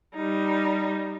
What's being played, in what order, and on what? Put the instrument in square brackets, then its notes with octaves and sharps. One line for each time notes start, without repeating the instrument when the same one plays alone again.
[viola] G3 D#4